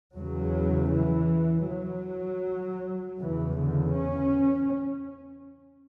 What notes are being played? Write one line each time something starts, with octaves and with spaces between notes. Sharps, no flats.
E2 C#3 F#3
E3
F#3
E2 C#3 E3
D3
C#4